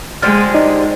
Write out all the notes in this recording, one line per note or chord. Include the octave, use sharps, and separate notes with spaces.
D3 F3 G#3 G4 F6 A6
D#4 D5 D#5